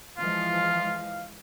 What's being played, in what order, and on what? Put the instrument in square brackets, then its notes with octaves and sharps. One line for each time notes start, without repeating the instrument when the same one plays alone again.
[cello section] E3 F3 G#3 [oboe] F4 [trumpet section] F5